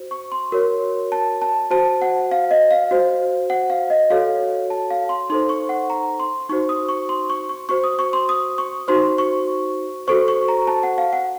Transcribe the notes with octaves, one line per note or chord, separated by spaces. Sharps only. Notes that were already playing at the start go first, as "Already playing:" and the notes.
Already playing: F#4 C5
C#6
C6
F#4 A#4 C#5
A5
A5
F#4 C5 A5
F#5
F5
D#5
F5
F#4 C5
F#5
F5
D#5
F#4 A4 C#5 F5
A5
F5
C6
D#4 A4 C5 C6
C#6
F#5
A#5
C6
D#4 F#4 C5 C#6
D#6
C#6
C6
C#6
C#6
F#4 C5 C#6
D#6
C#6
C6
D#6
C#6
D#4 F#4 C5 C6
C#6
F#4 A4 C5 C#6
C#6
A#5
A5
F#5
F5
F#5